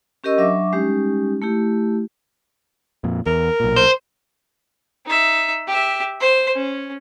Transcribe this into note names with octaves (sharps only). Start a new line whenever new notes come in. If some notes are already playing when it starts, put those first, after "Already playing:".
C#4 G4 A#4 D#5 C#6 E6
F#3 D4 E5 C#6 D6
G3 G#3 C#4 D#4 G4
A3 E4 G4
F2 A#2
E2 A#4
B1 A#2
C5
D#4 E5
G4 E5
C5
C#4